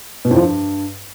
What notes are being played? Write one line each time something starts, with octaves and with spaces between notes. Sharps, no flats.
B2
F2
F3
G2